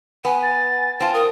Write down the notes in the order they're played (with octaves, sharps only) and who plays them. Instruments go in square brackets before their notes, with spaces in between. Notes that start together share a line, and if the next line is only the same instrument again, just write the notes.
[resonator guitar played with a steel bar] B3 [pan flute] G#5
[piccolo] A6
[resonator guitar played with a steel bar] C4 F4 [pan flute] A5
[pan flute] A#4 [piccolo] D#6